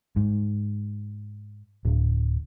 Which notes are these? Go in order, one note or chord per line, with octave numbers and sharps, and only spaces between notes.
G#2
D1